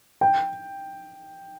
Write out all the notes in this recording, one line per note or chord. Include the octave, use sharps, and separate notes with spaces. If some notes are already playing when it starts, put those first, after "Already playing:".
G5